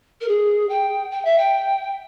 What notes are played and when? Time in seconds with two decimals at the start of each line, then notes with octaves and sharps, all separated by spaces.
0.20 A#4
0.28 G#4
0.69 G5
1.11 G5
1.24 E5
1.38 G5